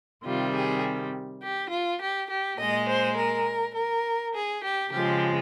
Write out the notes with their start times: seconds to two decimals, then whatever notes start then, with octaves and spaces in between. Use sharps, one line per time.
0.24 C3 D#3 G3 F4
0.54 G#4
1.41 G4
1.70 F4
2.00 G4
2.28 G4
2.59 A#2 G#3 D#5
2.87 C5
3.16 A#4
3.74 A#4
4.34 G#4
4.63 G4
4.91 C#3 F3 G#3 G4